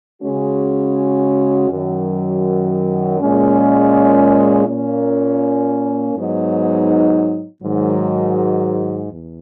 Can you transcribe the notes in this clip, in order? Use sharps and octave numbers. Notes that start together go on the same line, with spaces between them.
C#3 G#3 C#4 F#4
F#2 D#3 F#3
A#2 G#3 C#4
A#2 A#3 C#4
G#2 F#3 B3 D#4
G#2 D#3 F#3
E2